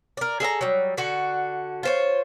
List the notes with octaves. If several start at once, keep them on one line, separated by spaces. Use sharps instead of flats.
A#4 D5
G#4 A4 E5 A#5
F#3 G3
D3 F#4
F4 C5 C#5